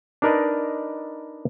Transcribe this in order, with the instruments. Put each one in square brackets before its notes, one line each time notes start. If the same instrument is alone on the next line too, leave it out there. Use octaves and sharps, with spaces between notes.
[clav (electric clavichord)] D4 D#4 A#4 B4 D5 D#5